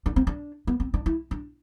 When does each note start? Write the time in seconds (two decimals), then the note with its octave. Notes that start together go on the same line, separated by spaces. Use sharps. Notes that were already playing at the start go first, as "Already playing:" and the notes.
0.06 D4
0.16 C4
0.27 D4
0.67 B3
0.80 C4
0.94 D4
1.06 E4
1.31 D4